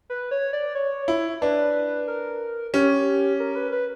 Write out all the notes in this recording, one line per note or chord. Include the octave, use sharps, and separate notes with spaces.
B4
C#5
D5
C#5
E4
D4 B4
A#4
C#4 G4
A#4
B4
B4